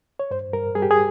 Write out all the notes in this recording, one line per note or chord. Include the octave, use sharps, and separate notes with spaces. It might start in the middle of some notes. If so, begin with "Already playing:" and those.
C#5
G2 C5
G2 A#4
G3 G#4
G4
G#4